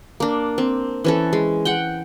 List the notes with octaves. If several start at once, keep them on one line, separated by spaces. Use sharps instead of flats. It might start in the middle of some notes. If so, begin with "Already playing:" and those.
A#3 D4
C4
E3 C#4 A4
G#3
F#5 G5